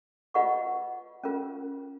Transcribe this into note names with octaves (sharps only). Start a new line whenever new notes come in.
F4 B4 D#5 F#5 C#6
C#4 F4 A#4